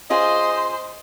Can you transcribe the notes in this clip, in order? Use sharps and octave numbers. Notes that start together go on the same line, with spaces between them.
C#4 F4 G#4 C5 D#5 C6